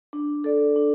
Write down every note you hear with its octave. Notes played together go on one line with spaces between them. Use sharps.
D4
A4 D5
D4